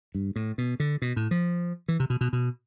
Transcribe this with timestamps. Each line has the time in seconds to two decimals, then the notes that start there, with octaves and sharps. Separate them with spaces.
0.15 G2
0.36 A2
0.58 B2
0.80 D3
1.02 B2
1.16 A2
1.31 F3
1.88 E3
2.00 C3
2.10 B2
2.21 B2
2.33 B2